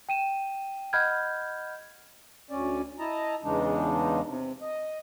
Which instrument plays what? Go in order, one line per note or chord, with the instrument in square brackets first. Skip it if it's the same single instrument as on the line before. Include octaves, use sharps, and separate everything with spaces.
[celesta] G5 D#7 E7
D#5 F#5 B5 F6 G6 G#6
[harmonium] D2 C#4 D5
E4 D#5 A5 A#5
E2 C#3 E3 G#3 D4 D#4
C3
D#5